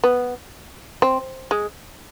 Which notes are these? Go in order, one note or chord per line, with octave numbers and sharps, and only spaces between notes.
B3
C4
G#3